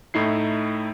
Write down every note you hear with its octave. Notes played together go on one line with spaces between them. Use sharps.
A2 A3 D#4 E4 C7